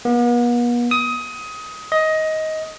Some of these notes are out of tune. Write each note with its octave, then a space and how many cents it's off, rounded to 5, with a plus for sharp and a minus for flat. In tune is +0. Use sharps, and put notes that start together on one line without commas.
B3 -45
D#6 +20
D#5 +15